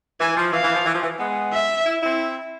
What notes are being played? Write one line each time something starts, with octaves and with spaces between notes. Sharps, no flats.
E3 G#5
F3
E3 F5
E3
F3
E3
F3
E3
G#3 B3
E5
E4
C4 E4